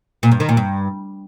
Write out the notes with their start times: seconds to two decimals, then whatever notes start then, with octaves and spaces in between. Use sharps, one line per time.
0.23 A#2
0.31 G2
0.40 D#3
0.49 A#2
0.57 G2